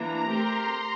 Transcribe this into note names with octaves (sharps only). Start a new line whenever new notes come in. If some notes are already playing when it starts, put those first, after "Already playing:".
Already playing: E3 A#3 D4 A#5
A3 C4 G4 A#4 C6